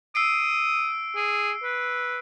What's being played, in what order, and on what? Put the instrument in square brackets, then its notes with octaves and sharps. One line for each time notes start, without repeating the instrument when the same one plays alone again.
[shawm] D#6 [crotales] E6 C7 D7
[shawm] G#4
B4